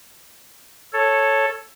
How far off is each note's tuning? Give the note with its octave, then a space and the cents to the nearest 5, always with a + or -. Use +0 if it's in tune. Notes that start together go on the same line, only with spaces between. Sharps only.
A4 +0 C#5 -5